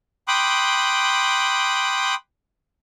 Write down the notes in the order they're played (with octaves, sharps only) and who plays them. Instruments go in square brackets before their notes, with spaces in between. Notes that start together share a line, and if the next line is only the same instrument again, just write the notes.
[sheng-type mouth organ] G5 B5 C6 D6 D#6 F#6